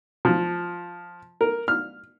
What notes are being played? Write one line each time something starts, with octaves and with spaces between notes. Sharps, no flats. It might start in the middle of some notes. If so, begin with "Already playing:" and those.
F3
A#4
F6